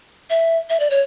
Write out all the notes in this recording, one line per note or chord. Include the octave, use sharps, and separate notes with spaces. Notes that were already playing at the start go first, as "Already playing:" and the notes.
E5
E5
D5
C#5